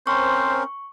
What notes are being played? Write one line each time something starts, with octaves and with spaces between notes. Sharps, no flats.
C4 C#4 A#4 C5 C#6